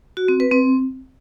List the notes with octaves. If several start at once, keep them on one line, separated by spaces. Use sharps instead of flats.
F#4
C4
B4
C4